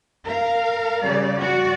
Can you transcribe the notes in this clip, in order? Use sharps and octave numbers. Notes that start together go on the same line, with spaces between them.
A#4 F5
C#3 G3 D5
F#4 D5